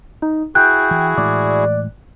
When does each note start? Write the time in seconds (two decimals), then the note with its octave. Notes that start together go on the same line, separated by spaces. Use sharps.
0.22 D#4
0.55 E4 F#4 G#4 G5 F#6
0.91 E3
1.17 A2 E3 G#3 D5